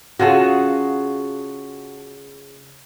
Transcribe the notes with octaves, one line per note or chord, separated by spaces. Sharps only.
C#3 F4 F#4 G#4 A4